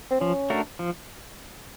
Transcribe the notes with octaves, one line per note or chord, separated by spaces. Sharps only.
C4
F3 C#4
A3 D4 F#4 A#4
F3